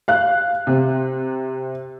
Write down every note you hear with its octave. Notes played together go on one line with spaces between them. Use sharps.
F5 F#6
C3